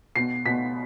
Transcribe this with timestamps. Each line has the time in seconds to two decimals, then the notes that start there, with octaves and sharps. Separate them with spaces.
0.16 B2 C7
0.46 B2 B6